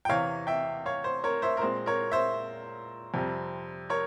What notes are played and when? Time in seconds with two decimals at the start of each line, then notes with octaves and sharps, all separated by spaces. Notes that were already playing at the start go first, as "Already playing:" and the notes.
0.05 G5
0.09 E2 C3 E3 C#5 F5
0.47 E5 G5
0.86 C#5 F5
1.04 C5
1.24 A#4 C#5
1.42 C5 E5
1.57 A#4
1.61 A#2 G#3 C4 C5
1.86 A#4 C#5
2.12 C5 E5
3.14 F2 C3 G3 C4
3.90 A#4 C#5